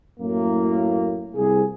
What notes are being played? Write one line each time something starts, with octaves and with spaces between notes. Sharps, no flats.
F#2 A2 A#3
C2 G#4